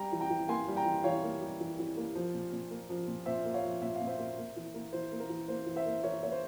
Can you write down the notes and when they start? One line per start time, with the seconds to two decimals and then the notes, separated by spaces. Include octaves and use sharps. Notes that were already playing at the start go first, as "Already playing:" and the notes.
Already playing: G3 G5 A#5
0.12 E3
0.20 G5 A#5
0.30 E3
0.48 A#3 G#5 C6
0.68 G3
0.76 G5 A#5
0.85 E3
1.04 E3 C#5 F5
1.23 A#3
1.41 G3
1.60 E3
1.79 E3
1.97 A#3
2.15 F3
2.34 A#2
2.52 A#2
2.71 A#3
2.89 F3
3.07 A#2
3.26 A#2 C5 E5
3.45 A#3
3.54 C#5 F5
3.63 F3
3.82 A#2 E5
3.95 F5
4.01 A#2
4.07 C5 E5
4.18 A#3
4.37 A#3
4.56 E3
4.74 A#3
4.93 E3 C5
5.12 A#3
5.20 A#4
5.29 E3
5.48 A#3 C5
5.66 E3
5.76 C5 E5
5.86 A#3
6.03 E3 A#4 C#5
6.23 A#3 C#5
6.32 C5